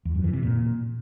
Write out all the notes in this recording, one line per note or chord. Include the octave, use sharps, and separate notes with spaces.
E2
F#2
E3
C3
A#2